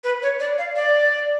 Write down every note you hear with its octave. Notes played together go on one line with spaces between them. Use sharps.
B4
C#5
D5
F5
D5